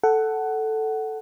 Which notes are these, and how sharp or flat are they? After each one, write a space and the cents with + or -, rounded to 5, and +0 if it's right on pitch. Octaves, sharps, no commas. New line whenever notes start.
A4 +0 F#5 +15